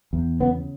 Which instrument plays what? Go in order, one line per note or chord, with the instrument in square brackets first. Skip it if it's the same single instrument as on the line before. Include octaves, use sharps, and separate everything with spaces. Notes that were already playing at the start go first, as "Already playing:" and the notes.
[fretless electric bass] E2
C#3 B3